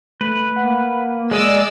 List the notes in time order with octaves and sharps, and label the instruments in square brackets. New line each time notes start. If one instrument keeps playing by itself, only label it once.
[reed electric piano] A3 [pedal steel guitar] B4
[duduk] A#3 [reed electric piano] F#5
[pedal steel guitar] G#3 D#5 [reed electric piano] G#4 [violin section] D5 E6